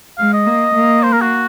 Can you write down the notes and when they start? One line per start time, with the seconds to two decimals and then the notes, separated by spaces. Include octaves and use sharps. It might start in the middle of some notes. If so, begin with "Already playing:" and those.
0.18 G#3 F5
0.33 D#5
0.47 A#3
0.75 A#3
1.03 C5
1.12 A#4
1.22 F#4